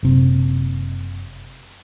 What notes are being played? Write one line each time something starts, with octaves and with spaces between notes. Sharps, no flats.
F#1 C3